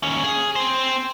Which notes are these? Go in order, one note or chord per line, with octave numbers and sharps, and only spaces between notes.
D#2 C#4
G#4
C4 C5